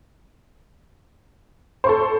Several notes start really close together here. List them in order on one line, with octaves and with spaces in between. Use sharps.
C5 C#6 A4